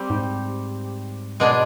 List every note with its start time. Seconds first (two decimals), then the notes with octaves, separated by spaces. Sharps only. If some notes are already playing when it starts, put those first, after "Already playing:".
Already playing: G3 C4 G4
0.10 G#2
1.40 B2 G#3 D4 G#4